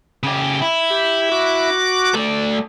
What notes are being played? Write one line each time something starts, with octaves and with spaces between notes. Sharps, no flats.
C#3 G4
E4
G4
F#4 D6
A3 D5